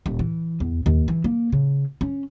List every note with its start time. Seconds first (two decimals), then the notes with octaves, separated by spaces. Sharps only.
0.06 D#1
0.19 E3
0.60 E2
0.86 D#2
1.08 E3
1.24 A#3
1.52 C#3
2.01 C#4